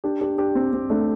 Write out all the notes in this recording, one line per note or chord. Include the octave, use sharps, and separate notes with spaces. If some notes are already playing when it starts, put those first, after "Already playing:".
D4 G4
D4 G4
D4 G4
C4
C4
A3 D4